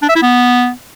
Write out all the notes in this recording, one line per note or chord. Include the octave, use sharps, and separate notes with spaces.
D4
E5
E4
B3